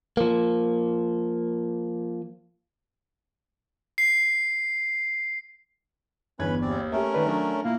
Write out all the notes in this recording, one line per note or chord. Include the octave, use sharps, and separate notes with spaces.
F3 A#3
C7
G1 E2 C#4 B4 B5 G#6
D#2 C4 D5
A3 C#4 G4 A#4 E5
D#3 B4 D5
F#3 D4 F#4 D5
A#2 A#3 E4